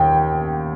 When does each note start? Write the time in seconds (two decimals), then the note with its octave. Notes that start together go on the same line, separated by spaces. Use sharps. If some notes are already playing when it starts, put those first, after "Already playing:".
Already playing: D#2 G5